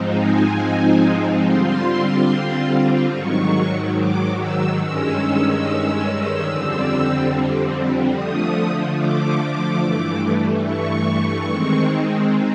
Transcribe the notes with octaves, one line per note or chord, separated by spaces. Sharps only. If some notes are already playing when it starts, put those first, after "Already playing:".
Already playing: G#2 F3 G#3 C4 D#4
G#5
D3 G3 C4 F4 C6
G#2 D#3 F#3 C#6
D6
E6
G2 D#3 G#3 C#4 E6
F2 D3 G3 C4
D3 F3 A3 D#6
D6
G2 E3 A3
C#6
D#3 G#3 C4